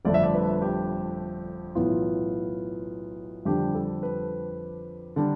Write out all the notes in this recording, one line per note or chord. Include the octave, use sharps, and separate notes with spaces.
G1 F2 D3 A3 D4 D5
E5
D5
B4
G4
B1 A2 E3 B3 F4
F2 D3 G3 D4 G4
A4
B4
D3 G3 D4